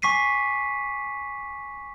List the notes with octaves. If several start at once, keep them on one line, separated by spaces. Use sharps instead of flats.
G#5 C#6 D6 B6 C7 D#7